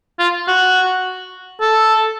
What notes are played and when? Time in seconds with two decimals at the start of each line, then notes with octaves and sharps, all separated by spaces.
0.19 F4
0.48 F#4
1.61 A4